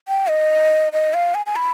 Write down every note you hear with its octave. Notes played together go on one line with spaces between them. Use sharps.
G5
D#5
D#5
F5
G#5
G#5
B5